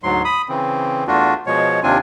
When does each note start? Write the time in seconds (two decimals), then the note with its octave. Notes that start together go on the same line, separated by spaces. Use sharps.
0.03 D2 G#2 F#3 C6
0.25 B5 D#6
0.49 C#3 E3 C4
1.07 E2 A3 D4 F4 F#4
1.47 B2 F3 G#3 C#5
1.83 D#2 C3 C4 D4 F4 G#5